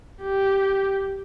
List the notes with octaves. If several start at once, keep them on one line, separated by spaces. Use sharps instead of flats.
G4